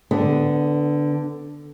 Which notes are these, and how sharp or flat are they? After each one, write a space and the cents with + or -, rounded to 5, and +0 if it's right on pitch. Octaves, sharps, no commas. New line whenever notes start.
D3 +0 B3 +15